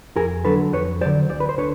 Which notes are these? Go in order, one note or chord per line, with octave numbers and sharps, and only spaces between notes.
F2 G#4 A#4
D3 F#3 A4 B4
F2 B4 C#5
D3 F#3 C5 D5
D2 C5 D5
B4
C5
D3 B4 C#5